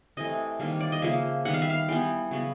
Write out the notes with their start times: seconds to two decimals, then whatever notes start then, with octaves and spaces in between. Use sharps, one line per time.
0.17 C3 E3 A3 D#5
0.60 C3 D#3 G3 A#3
0.80 D5
0.92 D#5
1.02 C#3 F3 A#3 E5
1.45 D#3 G3 B3 F#5
1.54 F5
1.62 E5
1.70 F5
1.89 E3 G3 B3 G5
2.31 C#3 F#3 B3